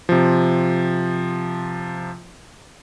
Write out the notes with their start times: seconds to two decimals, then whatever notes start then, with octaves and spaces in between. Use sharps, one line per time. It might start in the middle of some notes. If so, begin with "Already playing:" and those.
0.09 C3 F3